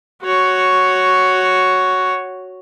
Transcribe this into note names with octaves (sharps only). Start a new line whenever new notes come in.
F#4 C#5